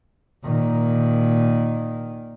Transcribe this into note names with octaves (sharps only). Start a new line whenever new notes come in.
A#2 D#3